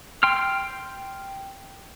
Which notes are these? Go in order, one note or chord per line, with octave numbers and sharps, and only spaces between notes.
G5 C6 F6